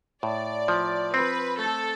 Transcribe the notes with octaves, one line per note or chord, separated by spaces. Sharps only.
A2 D5
F3
C4 B4
A3 A4